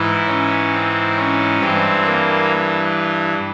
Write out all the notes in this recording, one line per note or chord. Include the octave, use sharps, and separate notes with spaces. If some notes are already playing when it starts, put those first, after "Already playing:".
Already playing: G#2 E3 E4
C#4
C4
C#4
G2 E3 C4
A#3